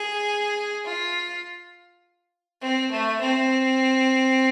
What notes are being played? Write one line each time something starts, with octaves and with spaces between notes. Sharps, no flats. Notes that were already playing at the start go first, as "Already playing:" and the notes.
Already playing: G#4
F4
C4
A3
C4